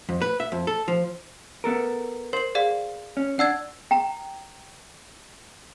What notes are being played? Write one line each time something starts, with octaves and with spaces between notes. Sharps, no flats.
F2
B4
E5
F2
A4
F3
B3 A4 A#4
A#4 C5 F#7
G#4 D5 F5
C#4
D4 F#5 E6 G#6
G5 A#5